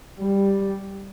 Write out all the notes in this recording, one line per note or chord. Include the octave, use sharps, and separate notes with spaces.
G3